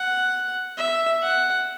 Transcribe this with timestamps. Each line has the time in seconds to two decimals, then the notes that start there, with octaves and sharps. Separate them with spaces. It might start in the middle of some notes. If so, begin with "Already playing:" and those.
Already playing: F#5
0.78 E5
1.22 F#5